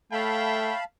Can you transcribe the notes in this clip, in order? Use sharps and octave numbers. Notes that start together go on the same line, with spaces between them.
A3 C#5 E5 F5 G5 A5 B5